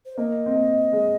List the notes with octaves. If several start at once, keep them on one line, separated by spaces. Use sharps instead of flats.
C5
A#3 D#5
C4
A#3
G#3